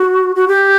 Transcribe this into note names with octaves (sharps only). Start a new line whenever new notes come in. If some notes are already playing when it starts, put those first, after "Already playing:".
Already playing: F#4
F#4
G4